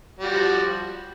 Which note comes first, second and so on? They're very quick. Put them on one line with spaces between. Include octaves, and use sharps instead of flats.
G3 F#4 F3